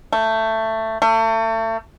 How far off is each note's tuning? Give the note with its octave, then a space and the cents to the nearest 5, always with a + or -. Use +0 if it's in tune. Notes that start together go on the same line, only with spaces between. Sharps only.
A3 +15
A3 +35